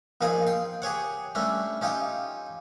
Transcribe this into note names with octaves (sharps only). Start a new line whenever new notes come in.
A#1 A#2 D#4 F4 G#4 D#5
G5 C6
G4 G#4 C#5 F#5
G3 A3 C#4 D4
C#4 D#4 F4 G4 G5